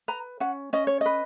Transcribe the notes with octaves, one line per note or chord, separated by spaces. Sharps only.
B4 A#5
C#4 F#5
C#4 D#5
C#5
B4 D#5